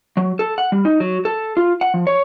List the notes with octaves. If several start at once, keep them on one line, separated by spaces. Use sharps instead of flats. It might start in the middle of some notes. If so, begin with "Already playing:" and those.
F#3
A4
F#5
G3
D#4
F#3
A4
F4
F#5
F3
C#5